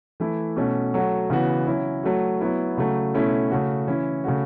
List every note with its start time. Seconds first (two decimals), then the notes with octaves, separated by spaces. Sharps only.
0.20 E3 A3 E4
0.56 B2 A3 C#4 F#4
0.94 F#3 A3 F#4
1.30 C#3 E3 B3 F#4
1.67 F#3 C#4 E4
2.03 F#3 A3 F#4
2.40 F#3 B3 E4
2.77 C#3 F#3 A3
3.14 B2 A3 C#4 E4
3.51 C#3 A3 F#4
3.87 E3 C#4 E4
4.24 C#3 A3 F#4